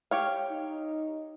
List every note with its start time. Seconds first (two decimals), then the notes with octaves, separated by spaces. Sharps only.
0.11 G4 C#5 F5
0.50 D#4